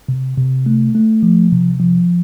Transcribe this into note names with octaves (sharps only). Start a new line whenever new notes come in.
C3
C3
A3
A3
F3
C3
F3